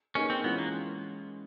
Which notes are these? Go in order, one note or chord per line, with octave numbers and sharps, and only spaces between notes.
A#3 C#4 D#4 G#4 B4
C4
E3 G#3 B3 C#4 F4
A#3